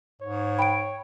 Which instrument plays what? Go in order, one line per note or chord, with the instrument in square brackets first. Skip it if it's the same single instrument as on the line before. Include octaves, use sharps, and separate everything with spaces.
[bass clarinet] G#2 [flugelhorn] C#5
[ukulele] G5 [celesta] B5 D7